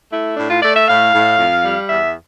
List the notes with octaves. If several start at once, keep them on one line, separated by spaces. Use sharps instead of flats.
A3 E4
A2 D4
F4
A3 D5
E5
A2 F5
A2
F2
G3
E2 E5